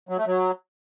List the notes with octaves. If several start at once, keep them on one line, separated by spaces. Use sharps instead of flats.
F#3
A3
F#3